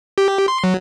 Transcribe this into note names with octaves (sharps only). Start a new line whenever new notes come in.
G4
C6
F#3